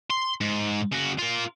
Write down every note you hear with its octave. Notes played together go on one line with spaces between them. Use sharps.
C6
G#2
C#3 F#4
F4 A#4